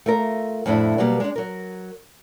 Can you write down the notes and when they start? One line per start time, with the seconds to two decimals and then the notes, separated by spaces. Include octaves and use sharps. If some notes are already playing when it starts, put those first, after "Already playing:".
0.06 A3 F4 A#4
0.66 F2 A2 A3 D4 E4
0.98 B2 F#3 G3 A#3
1.20 G#3 D4
1.36 F#3 A#4